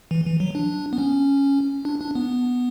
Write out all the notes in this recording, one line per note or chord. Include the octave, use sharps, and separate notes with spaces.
E3
E3
F#3
D4
B3
C#4
D4
D4
B3